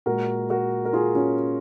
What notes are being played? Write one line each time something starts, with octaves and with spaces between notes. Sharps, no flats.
A#2 G#3 F#4 A#4
F#4 A#4
A#4
F4 G#4
C#4 F4